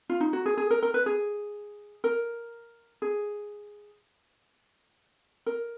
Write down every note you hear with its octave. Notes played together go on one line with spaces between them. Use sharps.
F4
D#4
F#4
G#4
G#4
A#4
A#4
B4
G#4
A#4
G#4
A#4